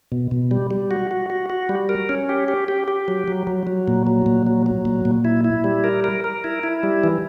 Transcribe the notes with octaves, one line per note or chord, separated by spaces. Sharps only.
B2
B2
G3
G3
F#4
F#4
F#4
F#4
G3
A#4
C#4
G4
G4
G4
G4
F#3
F#3
F#3
F#3
A#2
F#3
A#2
F#3
F#3
A#2
A#2
E4
E4
G3
A#4
A#4
A#4
E4
E4
G3
E3